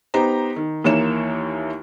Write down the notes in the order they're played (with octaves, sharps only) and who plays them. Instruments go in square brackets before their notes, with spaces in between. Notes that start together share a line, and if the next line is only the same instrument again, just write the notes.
[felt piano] B3 D#4 G4 C5 A#5
D#3
D#2 E3 A#3 C#5 E7